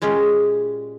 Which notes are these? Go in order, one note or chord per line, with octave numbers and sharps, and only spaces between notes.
A#2 G#3 C#4 F4 G4